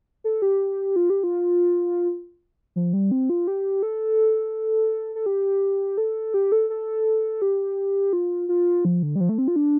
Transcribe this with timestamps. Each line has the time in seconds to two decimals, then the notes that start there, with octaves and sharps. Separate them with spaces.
0.24 A4
0.42 G4
0.96 F4
1.10 G4
1.23 F4
2.76 F3
2.93 G3
3.11 C4
3.30 F4
3.47 G4
3.83 A4
5.15 A4
5.26 G4
5.97 A4
6.34 G4
6.52 A4
6.70 A4
7.42 G4
8.13 F4
8.49 F4
8.85 F3
9.03 D3
9.16 G3
9.20 F3
9.29 A3
9.38 C4
9.48 F4
9.56 D4